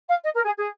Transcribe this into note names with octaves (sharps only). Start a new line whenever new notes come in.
F5
D#5
A#4
G#4
G#4